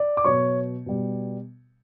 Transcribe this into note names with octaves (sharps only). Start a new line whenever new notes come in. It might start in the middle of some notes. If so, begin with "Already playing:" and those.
Already playing: D5
D6
B2 F#3 C#5 C#6
B2 G3